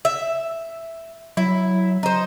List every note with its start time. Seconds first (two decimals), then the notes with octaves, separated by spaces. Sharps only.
0.05 E5
1.37 F#3 E4
2.03 D#4 C5